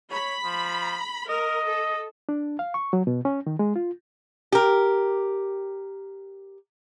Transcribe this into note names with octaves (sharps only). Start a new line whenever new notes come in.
C#5 B5
F3
A#4 D#5
A4
D4
F5
C#6
F#3
B2
C#4
D#3
G#3
F4
G4 A#4